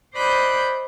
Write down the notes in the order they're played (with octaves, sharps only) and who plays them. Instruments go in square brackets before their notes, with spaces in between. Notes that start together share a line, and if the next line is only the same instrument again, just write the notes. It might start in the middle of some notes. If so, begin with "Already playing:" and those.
[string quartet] C5 D5 D#5 B5 F#6 G6